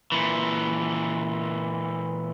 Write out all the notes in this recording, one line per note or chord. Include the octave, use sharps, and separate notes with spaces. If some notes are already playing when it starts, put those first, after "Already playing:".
A#2 E3